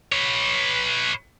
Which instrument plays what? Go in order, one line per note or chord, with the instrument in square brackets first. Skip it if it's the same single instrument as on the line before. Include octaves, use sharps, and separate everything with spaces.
[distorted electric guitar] B4 C#5